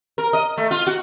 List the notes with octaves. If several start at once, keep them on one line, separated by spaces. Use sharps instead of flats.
A#4
D#5
A3
F4
F#4